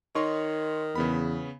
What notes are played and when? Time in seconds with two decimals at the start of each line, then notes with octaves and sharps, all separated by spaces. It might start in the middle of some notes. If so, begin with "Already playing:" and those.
0.15 D#3 D#4 C#5 D#5 C6
0.96 E2 C#3 B3 B5